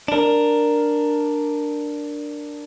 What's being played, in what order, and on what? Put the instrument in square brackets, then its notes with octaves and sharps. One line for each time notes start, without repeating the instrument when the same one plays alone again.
[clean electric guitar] D4 A#4